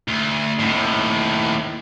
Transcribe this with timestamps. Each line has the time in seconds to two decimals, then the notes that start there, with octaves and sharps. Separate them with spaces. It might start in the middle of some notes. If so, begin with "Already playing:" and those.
0.08 D2
0.59 D#2 A2